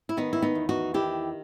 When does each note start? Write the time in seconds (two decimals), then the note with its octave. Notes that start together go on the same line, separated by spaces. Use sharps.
0.09 E4
0.17 D#3 B3 D#4
0.33 E4
0.42 B3 D#4
0.55 E2
0.69 D#4 F#4
0.94 D#3 E4 G4